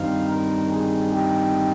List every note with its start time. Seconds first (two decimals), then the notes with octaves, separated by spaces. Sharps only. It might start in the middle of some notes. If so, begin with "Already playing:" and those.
Already playing: G2 D#3 G3 C4 D#4 F5
0.30 A#4
0.72 G#4
1.13 G4